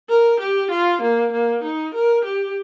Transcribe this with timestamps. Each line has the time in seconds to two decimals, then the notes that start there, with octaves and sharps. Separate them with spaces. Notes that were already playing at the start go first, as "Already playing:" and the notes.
0.09 A#4
0.40 G4
0.71 F4
1.02 A#3
1.32 A#3
1.63 D#4
1.94 A#4
2.25 G4